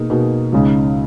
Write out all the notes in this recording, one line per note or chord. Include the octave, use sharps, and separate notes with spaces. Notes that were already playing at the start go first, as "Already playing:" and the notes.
Already playing: B2 A#3 D#4 G#4
B2 A#3 D#4 G#4
C#2 C#3 G#3 D#4